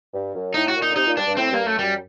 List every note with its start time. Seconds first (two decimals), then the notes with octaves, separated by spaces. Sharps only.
0.14 G2
0.34 F#2
0.54 A2 D#4
0.68 F#4
0.75 A#2
0.82 D#4
0.90 D3
0.96 C3 D#4
1.07 A#2
1.16 G2 D4
1.27 G2
1.37 A2 C4
1.51 G2 A#3
1.65 F#2 A3
1.78 F#2 G3